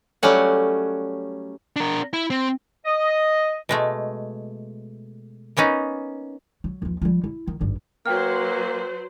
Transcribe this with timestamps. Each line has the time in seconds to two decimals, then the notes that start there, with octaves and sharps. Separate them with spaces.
0.23 F#3 G3 A3 C#4 F#5
1.76 D4 A#4
2.13 E4
2.30 C4
2.85 D#5
3.69 B2 G#3 A3
5.57 A#3 B3 C#4 D#4
6.64 F#3
6.82 D#2 F3
7.02 F3 G3
7.24 E4
7.47 D#3
7.61 G#1 G2
8.06 F#3 A#3 F#4 B4 C5 G5 F6